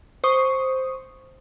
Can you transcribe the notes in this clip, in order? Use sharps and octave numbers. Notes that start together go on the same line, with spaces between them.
C5 C#6 D#6